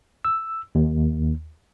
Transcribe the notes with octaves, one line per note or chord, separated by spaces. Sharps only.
E6
D#2